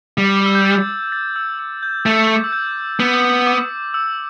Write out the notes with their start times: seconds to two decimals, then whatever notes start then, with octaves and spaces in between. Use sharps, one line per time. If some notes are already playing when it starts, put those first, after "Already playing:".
0.18 G3
0.37 D6
0.46 E6
0.55 G6
0.65 A6
1.12 A6
1.36 E6
1.59 E6
1.83 G6
2.06 A3 A6
2.35 D6
2.44 E6
2.52 G6
3.00 B3 E6
3.47 D6
3.94 E6